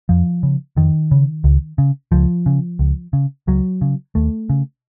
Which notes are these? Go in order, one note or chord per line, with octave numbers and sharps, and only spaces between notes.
F2 F3
C#3
F2 D#3
C#3
C#2
C#3
C#2 F3
C#3
C#2
C#3
C#2 F#3
C#3
D#2 A3
C#3